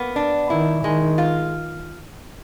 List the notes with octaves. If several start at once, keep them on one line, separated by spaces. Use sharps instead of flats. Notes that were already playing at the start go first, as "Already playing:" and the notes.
Already playing: A#3 B3
D4
D#3 E4
D#3 G#3
F4